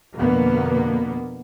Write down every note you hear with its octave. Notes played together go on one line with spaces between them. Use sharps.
F2 B2 D3 A#3 B3